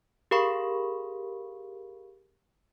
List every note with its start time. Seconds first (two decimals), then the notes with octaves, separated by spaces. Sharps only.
0.31 G4 G#4 A#4 F5 B5 C#6